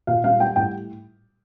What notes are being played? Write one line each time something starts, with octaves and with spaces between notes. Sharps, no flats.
A#2 F5
G3 F5
G3 G5
A2 G5